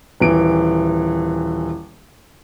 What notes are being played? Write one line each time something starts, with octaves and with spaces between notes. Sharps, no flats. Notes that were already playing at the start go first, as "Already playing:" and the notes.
D#1 E3 D7